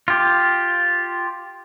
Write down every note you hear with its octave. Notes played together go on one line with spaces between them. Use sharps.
F4 G4